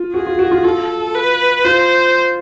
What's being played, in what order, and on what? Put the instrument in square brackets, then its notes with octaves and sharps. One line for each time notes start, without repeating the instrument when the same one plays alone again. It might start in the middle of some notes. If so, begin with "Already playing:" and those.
Already playing: [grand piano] F4
[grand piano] F#4 [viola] G#4
[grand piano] F4
F#4
F4
[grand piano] F4 [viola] A4
[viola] B4
[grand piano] F4 [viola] C5